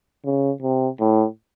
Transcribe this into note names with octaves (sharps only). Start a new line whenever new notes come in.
C#3
C3
A2